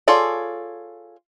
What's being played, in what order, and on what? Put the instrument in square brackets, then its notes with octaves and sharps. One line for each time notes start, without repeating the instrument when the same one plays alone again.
[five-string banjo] F4 G#4 A4 C#5 D5